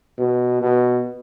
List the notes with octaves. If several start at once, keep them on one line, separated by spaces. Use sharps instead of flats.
B2
B2